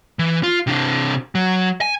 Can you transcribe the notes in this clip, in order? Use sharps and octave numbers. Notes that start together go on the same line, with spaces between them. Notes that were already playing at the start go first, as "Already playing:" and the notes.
E3
F4
C3 D4
F#3
G#5